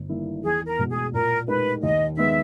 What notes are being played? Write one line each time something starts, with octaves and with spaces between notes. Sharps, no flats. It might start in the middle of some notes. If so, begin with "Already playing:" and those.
Already playing: G1
G2 D#3 A#3 E4
E2 G#4
A#4
B2 G#3
G#4
A#2 A#4
G#3 D#4 G4 A#4 B4
D#2 D#5
D#3 G#3 B3 E5